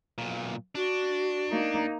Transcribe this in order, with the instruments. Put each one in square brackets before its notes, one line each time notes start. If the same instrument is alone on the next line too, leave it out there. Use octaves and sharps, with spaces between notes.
[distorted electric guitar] B1 A#2
[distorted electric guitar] D4 [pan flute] F#4
[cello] A#3 D#4